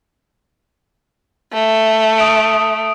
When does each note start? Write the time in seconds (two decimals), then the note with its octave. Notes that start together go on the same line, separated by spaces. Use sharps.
1.53 A3
2.18 D#6 D7